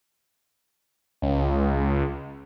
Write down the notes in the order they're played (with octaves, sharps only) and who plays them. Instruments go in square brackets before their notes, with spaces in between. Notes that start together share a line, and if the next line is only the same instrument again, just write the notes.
[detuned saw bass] C#2